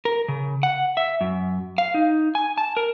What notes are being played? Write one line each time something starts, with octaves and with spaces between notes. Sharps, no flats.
A#4
C#3
F#5
E5
F#2
F5
D#4
G#5
A5
A#4